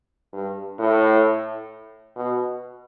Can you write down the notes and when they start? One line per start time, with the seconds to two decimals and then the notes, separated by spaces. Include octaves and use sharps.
0.33 G2
0.79 A2
2.16 B2